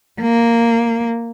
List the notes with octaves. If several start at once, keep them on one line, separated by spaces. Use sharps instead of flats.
A#3